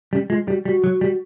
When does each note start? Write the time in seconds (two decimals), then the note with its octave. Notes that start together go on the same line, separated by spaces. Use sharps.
0.13 G3 C#4
0.30 G#3 F4
0.48 G3 F#4
0.65 G3 F#4
0.84 F#3
1.01 G3